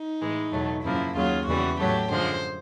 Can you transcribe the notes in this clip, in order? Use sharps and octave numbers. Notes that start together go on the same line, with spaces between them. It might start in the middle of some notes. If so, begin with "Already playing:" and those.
Already playing: D#4
A2 E3 G#3
E2 B2 F#3 A3
F#2 C#3 F3 A#3 E4
D#2 C#3 F#3 F4
E2 C#3 E3 G3 F#4
A2 F#3 A3 G4
F#2 D3 F3 G#3 C5